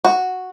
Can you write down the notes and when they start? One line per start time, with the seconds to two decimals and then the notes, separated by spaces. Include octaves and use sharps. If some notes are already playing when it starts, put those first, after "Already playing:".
0.04 F#4